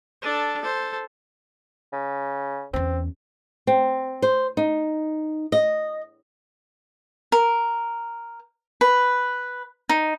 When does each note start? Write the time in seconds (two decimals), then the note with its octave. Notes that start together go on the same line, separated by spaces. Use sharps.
0.22 D4 A4
0.62 A4 C5
1.93 C#3
2.74 E2 C4 C#4
3.67 C4
4.22 C5
4.57 D#4
5.52 D#5
7.32 A#4
8.81 B4
9.89 D#4